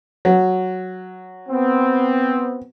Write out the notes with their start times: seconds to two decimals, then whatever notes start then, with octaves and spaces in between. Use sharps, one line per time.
0.25 F#3
1.49 B3 C4